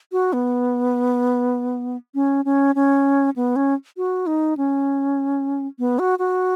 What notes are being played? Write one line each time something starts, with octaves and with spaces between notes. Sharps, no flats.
F#4
B3
C#4
C#4
C#4
B3
C#4
F#4
D#4
C#4
B3
F#4
F#4